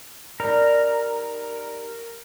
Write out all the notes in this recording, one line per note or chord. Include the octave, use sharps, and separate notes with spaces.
G3 D#4 A#4